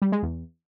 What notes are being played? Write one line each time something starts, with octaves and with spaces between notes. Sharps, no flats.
G3
G#3
E2